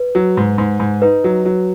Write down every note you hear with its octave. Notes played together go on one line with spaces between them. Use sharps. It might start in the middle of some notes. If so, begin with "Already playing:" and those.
Already playing: B4
F#3
G#2
G#2
G#2
D#4 B4
F#3
F#3